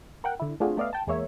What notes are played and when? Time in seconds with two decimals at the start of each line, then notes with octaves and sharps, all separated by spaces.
0.24 A#4 F#5 G5
0.40 D3 E4
0.60 A3 C4 D4 F4 F#4 G#4
0.77 A3 B3 D5 D#5 F5
0.93 G5 A5
1.07 E2 G#3 A#3 C#5 E5